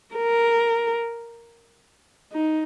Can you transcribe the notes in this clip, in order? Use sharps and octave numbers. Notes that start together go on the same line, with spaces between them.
A#4
D#4